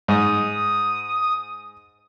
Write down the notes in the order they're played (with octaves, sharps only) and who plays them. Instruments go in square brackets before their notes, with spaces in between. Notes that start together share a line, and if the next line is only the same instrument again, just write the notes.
[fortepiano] G#2 [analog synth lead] D#6